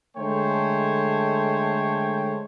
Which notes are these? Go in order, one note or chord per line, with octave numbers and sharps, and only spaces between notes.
D3 G#3 A3 C5 C#5 G5